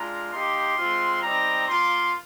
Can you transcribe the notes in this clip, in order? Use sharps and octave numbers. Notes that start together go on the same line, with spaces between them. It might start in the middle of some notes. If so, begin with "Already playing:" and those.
Already playing: G#3 D4 F4 A#5
A#3 D#4 G4 C6
G#3 C4 F4
G3 C4 D#4 A#5
A#3 F4 C6